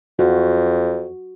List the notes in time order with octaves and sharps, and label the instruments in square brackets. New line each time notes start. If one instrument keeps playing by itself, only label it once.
[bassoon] F2 [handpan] F#4